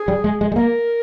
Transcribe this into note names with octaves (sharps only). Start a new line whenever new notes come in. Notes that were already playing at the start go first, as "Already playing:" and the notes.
Already playing: G#4
G3
G#3
G#3
G#3
A#3 A#4